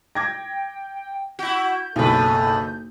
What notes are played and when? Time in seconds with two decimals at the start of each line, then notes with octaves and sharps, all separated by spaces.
0.15 G5 D6 G#6 A#6
1.39 E4 F#4 G6
1.96 F#1 B1 A2 A4 B4